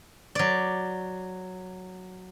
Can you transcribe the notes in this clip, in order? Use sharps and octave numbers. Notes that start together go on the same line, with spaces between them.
F#3 D5